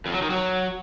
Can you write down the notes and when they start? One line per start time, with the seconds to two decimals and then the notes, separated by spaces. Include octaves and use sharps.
0.06 F2
0.14 F#3
0.22 D#3
0.30 F#3